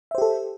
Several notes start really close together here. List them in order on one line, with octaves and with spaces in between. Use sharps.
E5 C5 G4 A4